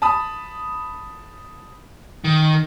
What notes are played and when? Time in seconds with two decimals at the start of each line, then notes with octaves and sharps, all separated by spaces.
0.02 A5 B5 D#6
2.24 D#3